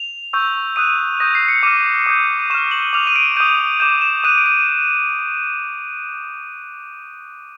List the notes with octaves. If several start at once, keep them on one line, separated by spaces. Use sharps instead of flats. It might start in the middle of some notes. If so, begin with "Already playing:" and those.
Already playing: F7
C#6 E6 G6
D#6 F#6 D#7
D#6 G6 A#6
C7
C#7
D6 F6 D#7
D#6 G6
D#7
C#6 F6 E7
F#7
D6 F6 F7
D#7
D7
D#6 G6 D#7
D6 G6 E7
E7
D#6 F#6 D#7
D7
D#7